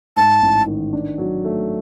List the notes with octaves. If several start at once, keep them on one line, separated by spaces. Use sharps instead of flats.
G#2 A5
A1
D#3
D4
F#3
A3